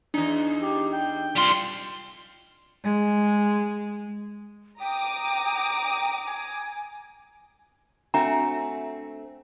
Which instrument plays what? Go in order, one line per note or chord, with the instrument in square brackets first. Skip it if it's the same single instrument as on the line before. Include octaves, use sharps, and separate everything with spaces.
[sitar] E2 D#4 [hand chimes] D4
[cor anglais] G4
G5
[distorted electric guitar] G3 C6 [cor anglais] F4
[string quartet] G#3
[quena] G5 [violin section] A#5 D6 D#6
[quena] G#5
[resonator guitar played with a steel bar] A3 C4 F#4 [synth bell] D4 E5 G#5 [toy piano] A#5